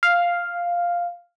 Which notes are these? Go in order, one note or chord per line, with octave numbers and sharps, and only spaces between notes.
F5